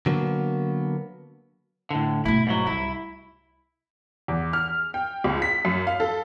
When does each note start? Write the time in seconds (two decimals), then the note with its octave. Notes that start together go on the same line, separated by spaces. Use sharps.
0.06 D3 F#3 A#3 B3
1.90 A2 D3
2.25 B2 A3 E4
2.47 G#2 F#3
2.67 C2 E4
4.28 E2
4.53 F6
4.94 G5
5.24 C#2
5.42 B6
5.65 F#2
5.87 F5
6.00 A4